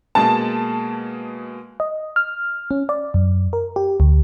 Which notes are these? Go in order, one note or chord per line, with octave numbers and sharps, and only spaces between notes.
B2 G#3 A#3 A5
D#5
F6
C#4
D5
F#2
A#4
G4
D2